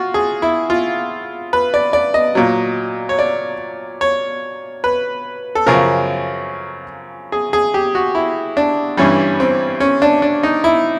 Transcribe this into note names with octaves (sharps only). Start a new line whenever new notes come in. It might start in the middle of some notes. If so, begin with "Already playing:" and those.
Already playing: F4 F#4
G#4
E4
F4
B4
D5
D5
D#5
A#2 F#3
C#5
D5
C#5
B4
A4
F#2 C#3 F3 A#4
G#4
G#4
G4
F#4
E4
D4
G2 E3 G3 C#4
C4
C#4
D4
D4
D#4
E4